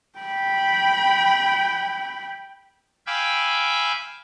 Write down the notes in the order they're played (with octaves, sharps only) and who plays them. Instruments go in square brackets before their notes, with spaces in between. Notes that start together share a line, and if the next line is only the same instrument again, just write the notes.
[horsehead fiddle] G5 B5
[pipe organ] F5 G5 G#5 B5 D6 E6